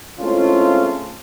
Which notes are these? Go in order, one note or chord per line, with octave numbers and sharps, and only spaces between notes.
G#3 A3 C4 C#4 E4 F4